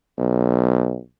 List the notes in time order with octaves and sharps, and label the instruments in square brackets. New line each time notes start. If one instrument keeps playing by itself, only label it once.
[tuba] B1